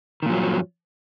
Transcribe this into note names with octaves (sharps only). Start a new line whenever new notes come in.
G2 A#2 D#3 F3 F#3